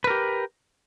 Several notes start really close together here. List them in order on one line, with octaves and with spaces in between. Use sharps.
B4 A#4 G4